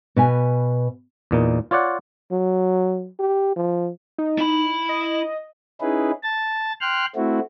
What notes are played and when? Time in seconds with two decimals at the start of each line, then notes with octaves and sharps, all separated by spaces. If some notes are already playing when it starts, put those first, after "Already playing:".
0.16 B2 B4 G#5
1.31 E2 A#2 D#4
1.71 F4 C#5 D5 F#5
2.32 F#3
3.19 G4
3.56 F3
4.18 D#4
4.39 E4 B5
4.89 D#5
5.81 C#4 D#4 E4 G#4 B4
6.23 A5 A6
6.81 G5 C6 F6 F#6
7.16 A3 C4 E4 F#4